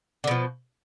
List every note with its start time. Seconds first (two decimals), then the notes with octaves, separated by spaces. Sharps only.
0.24 D3
0.27 B2
0.31 F3